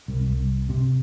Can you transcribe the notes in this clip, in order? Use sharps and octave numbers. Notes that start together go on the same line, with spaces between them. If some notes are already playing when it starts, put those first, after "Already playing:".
C2
C2
C3